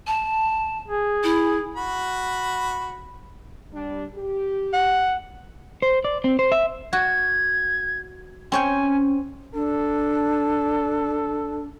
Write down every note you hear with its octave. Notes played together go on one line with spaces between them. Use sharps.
A5
G#4
E4
F#4 B5
G3 D4
G4
F#5
C5
D5
C4
C5
E5
F#4 G#6
C4 C#4 C#5 G5 G#5
D4 A4